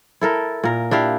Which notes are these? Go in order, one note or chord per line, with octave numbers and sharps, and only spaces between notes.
E4 A4 A#4
A#2 A#4
D4 E4 G4 F5